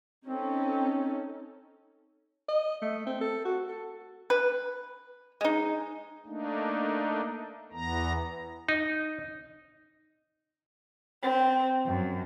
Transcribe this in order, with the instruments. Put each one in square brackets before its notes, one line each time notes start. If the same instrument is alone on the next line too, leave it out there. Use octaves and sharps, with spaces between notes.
[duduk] C4 [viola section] C#4 D#4 A4
[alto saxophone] D#5
A3
C4
A4
F#4
A4
[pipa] B4
G#3 D#4
[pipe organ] A3 A#3 D4 D#4
E2 E3 B3 A#5
[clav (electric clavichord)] D#4
[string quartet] C4
F#2